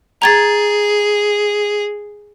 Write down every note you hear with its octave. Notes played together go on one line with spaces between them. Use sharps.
G#4 A#5 G#6 A6